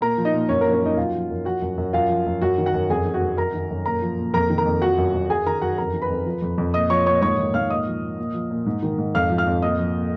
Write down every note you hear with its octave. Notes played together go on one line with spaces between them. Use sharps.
A#2 A#4 A#5
F3
D#4 D#5
A#2
F#2 C#4 C#5
A#3 A#4
F3
C#4 C#5
F#2 D#4 D#5
F#2 F4 F5
F3
F#2
F3 F#4 F#5
F#2
F#2
F#2 F4 F5
F3
F#2
F#2 F#4 F#5
D#3
F#4 F#5
F#2
F2 G#4 G#5
D#3
F#4 F#5
F2
F#2 A#4 A#5
D#3
F#2
A#2 A#4 A#5
F3
A#2
F2 A#4 A#5
D#3
A#4 A#5
F2
F3 F#4 F#5
F#2
F#2
F#2 G#4 G#5
D#3 A#4 A#5
F#2 F#4 F#5
F2 A#4 A#5
D#3
B4 B5
F2
F3
F2
F2
A#2 D#5 D#6
F3 C#5 C#6
A#2 C#5 C#6
G#2 C#5 C#6
D#3
G#2 F5 F6
A#2 D#5 D#6
F3
A#2
A#2
F3
A#2
G#2
D#3
G#2
F2 F5 F6
F3
F5 F6
F2
A#2 D#5 D#6
F3
A#2